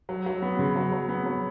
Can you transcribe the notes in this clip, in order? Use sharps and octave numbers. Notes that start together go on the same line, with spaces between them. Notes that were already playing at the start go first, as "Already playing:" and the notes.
F#3
F#3
B3
C#3
F#3
F#3
B3
F#3